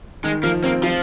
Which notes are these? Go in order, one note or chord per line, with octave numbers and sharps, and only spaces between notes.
D#3 G#3
F3 A#3
A#3 C4
F3 F4